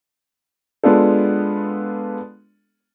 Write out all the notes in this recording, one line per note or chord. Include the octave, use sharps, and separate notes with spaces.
G#3 B3 D4 F4 A4